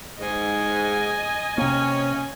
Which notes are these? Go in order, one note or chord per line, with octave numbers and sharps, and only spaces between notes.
G#2 D#5 G#5
C3 A#3 C#4